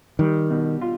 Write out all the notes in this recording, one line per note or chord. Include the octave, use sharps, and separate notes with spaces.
D#3 G3
B2
F4